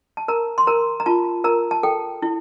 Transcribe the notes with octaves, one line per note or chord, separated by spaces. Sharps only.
A5
A#4 A#5
C6
A#4 A#5
A#5
F4 A5
A#4 A#5
A5
A4 G5
E4